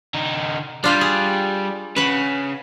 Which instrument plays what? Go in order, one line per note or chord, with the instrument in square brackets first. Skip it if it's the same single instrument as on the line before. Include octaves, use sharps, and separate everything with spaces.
[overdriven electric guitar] D3 D#4
[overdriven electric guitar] G3 [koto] D4 F4 G4
[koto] G#4
[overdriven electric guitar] C#3 [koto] B4 F#5